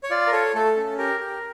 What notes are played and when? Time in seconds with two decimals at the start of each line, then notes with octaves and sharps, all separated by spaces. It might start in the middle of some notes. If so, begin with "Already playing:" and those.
0.03 C#5
0.10 F4 D5
0.27 A#4
0.32 A4 C#5
0.54 A3 A4
0.76 C#4
0.98 G4 A#4
1.20 G4